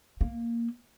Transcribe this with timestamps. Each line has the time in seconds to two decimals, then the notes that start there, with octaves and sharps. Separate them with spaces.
0.21 A#3